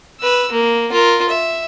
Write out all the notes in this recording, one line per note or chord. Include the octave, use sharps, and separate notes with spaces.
B4 E6
A#3
F4 A#4
E5